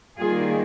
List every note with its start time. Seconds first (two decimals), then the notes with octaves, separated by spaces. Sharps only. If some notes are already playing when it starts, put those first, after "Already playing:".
0.19 D#3 G3 A#3 F4 G#4